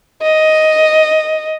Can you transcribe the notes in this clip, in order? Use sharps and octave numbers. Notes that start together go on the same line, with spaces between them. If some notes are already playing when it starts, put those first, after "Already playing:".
D#5